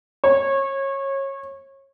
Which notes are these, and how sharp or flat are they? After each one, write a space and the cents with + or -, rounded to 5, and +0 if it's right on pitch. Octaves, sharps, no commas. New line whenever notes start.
C#5 -25